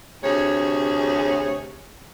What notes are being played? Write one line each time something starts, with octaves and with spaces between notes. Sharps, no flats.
D2 C3 G#4 C#5